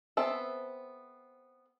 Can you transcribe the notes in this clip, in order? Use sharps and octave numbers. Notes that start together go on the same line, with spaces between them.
B3 C4 A4 E5